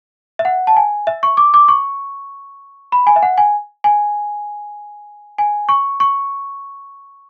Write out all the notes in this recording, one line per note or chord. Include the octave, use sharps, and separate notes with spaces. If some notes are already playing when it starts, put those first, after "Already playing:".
E5
F#5
A5
G#5
E5
C#6
D6
D6
C#6
B5
G#5
E5
F#5
G#5
G#5
G#5
C#6
C#6